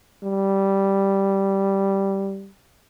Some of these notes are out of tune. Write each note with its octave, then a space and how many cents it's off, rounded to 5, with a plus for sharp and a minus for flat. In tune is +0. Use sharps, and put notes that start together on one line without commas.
G3 -5